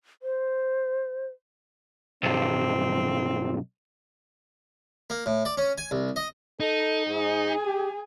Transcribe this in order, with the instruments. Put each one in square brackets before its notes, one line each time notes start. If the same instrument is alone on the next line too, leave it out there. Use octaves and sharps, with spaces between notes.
[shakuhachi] C5
[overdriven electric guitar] B1 G2 [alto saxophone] C4
[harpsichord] A#3
A2
D5
C#4
G#5
C2
D#5
[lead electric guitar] D#4 [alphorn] A4
[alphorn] G#2 [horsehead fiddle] G#4 G#5
[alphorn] G4